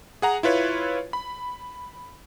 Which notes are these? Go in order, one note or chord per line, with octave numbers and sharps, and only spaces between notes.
G#4 F#5 A#5
E4 F4 B4 C#5
B5